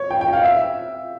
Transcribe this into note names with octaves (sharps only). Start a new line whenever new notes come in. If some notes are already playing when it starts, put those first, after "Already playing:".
Already playing: C#5
G5
G5
F5
E5